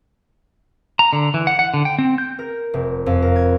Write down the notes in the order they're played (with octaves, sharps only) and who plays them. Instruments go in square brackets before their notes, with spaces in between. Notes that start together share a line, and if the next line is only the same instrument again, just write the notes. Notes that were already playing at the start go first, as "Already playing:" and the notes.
[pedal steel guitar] A#5
D3
E3
F#5
F#5
D3
G5
C4
G6
[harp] A#4
F1
F2
A#4
G#6